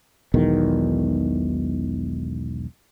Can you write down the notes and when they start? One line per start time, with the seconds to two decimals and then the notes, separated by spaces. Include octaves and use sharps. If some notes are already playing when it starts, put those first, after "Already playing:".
0.34 E1 B1 E2 D#3